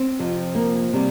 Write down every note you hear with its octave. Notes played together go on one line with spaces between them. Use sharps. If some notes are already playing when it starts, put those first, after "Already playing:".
Already playing: C4
F2 C3 F3
A#3
C3 G3